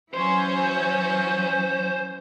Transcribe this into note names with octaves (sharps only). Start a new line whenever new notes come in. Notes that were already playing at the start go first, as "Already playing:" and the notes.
E3 F#3 C#4 C5